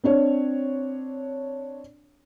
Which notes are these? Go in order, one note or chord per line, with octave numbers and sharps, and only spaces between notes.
C4 D4 C#5